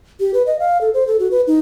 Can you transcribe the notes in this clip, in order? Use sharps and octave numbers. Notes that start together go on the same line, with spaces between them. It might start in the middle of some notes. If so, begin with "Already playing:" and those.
G4
B4
D#5
F5
A4
C5
A4
F#4
B4
D#4